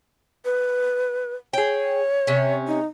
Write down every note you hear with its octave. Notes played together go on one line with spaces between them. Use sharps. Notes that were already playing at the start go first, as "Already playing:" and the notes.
B4
G#4 C#5 G5
C3 C#4
D#4